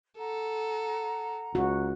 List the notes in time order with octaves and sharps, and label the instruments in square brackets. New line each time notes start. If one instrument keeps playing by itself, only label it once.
[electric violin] A4 [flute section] F#5 A#5
[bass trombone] C#2 [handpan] F#4